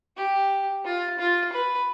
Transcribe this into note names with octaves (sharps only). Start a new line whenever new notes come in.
G4
F4
F4
B4